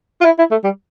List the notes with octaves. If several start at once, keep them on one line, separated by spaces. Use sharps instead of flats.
F4
E4
E4
A3
G3